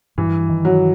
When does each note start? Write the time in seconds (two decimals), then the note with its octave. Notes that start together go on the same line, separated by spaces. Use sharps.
0.18 G2 E3
0.49 D#3
0.65 F#3